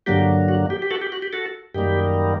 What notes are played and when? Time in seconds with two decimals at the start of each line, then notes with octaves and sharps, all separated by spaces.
0.06 G2 D3 F#3 A#3 G4
0.48 F#4
0.70 G4
0.82 G4
0.91 F#4 A4
1.02 G4
1.12 F#4
1.22 G4
1.33 F#4 A4
1.74 F#2 D#3 G3 A#3 G4